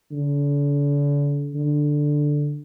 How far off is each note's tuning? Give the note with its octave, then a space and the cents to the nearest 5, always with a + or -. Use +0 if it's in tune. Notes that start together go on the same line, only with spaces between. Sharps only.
D3 -40
D3 +5